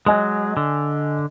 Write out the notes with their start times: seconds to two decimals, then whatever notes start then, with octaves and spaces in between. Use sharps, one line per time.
0.06 F#3 G#3 D#5 G#5
0.57 D3